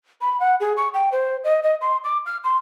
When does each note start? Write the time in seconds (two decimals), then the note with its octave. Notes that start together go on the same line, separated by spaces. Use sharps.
0.21 B5
0.40 F#5
0.60 G#4
0.77 C#6
0.94 G5
1.12 C5
1.44 D#5
1.63 D#5
1.81 C6
2.04 D6
2.26 F6
2.44 C6